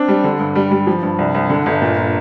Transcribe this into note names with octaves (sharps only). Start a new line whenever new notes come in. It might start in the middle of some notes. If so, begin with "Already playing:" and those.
Already playing: C4 D4
G3
D3
G2
G3
G3
F3
G2
C2
C2
D3
G1
A#2